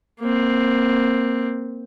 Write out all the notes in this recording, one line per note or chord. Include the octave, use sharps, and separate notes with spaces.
A#3 C4